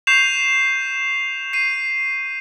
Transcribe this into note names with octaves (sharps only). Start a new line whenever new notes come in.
C#6 G6 C7 E7 F7
C7 D#7